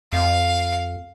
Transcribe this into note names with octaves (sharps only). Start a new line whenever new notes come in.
F2 F5